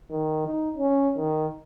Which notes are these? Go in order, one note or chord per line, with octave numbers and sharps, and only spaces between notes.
D#3
D#4
C#4
D#3